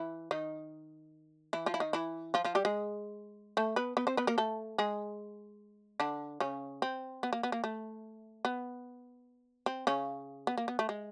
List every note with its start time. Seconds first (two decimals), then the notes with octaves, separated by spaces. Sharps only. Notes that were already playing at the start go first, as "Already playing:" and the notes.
Already playing: E3 E4
0.31 D#3 D#4
1.53 E3 E4
1.66 F3 F4
1.74 E4
1.80 D#3 D#4
1.93 E3 E4
2.34 F3 F4
2.44 F3 F4
2.55 G3 G4
2.65 G#3 G#4
3.57 A3 A4
3.76 B3 B4
3.97 B3 B4
4.07 C4 C5
4.17 B3 B4
4.27 A#3 A#4
4.38 A3 A4
4.78 G#3 G#4
6.00 D3 D4
6.40 C#3 C#4
6.82 C4
7.23 B3
7.33 A#3
7.43 B3
7.52 A#3
7.64 A3
8.45 B3
9.66 C4
9.87 C#3 C#4
10.47 B3
10.58 A#3
10.68 B3
10.79 A3
10.89 G#3